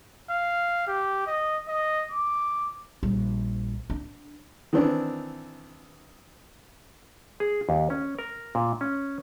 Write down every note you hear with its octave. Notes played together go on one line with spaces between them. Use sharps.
F5
G4
D#5
D#5
D6
A#1 G3
D4
D#3 E3 C4 D4
G#4
D#2
C#4
A#4
A#2
C#4